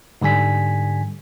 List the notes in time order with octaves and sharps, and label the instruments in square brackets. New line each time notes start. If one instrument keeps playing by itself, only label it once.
[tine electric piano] G#2 D3 G3 G#5 B6